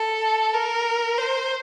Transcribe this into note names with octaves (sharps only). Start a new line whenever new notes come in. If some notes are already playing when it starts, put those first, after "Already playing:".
Already playing: A4
A#4
C5